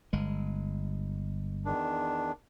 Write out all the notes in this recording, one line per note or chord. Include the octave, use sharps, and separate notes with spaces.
G1 G#3
E2 D#3 D4